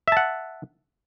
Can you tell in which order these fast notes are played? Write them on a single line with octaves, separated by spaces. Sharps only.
E5 A5 F#5